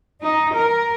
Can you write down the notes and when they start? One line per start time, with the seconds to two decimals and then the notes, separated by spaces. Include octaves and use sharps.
0.22 D#4
0.55 A#4